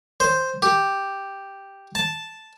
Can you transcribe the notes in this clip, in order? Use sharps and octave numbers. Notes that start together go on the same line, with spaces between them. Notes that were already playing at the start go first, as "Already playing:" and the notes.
C5
G4
A5